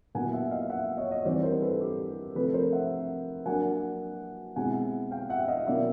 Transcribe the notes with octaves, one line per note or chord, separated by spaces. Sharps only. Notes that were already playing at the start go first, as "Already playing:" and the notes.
A#2 F#3 B3 E4 F#5 G#5
E5 F#5
D#5 F5
E5 F#5
C#5 D#5
C#5 D#5
E3 G3 C4 D#4 C5 D5
A#4 C5
A4 B4
G4
C3 F3 A3 C4 A4 B4
A#4 C5
E5 F#5
F#3 A#3 D4 F#5 G#5
B2 G#3 C4 E4 F#5 G#5
F5 G5
E5 F#5
D#5 F5
B2 F#3 A#3 C#4 E4 D5 E5